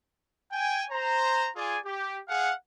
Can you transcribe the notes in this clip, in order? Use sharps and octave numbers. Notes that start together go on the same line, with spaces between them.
G5 G#5
C5 A#5
F4 G#4 D5 G#5
G4
G#4 F5 F#5